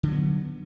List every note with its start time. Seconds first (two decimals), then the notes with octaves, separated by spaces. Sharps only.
0.03 D3
0.08 F#3
0.12 B3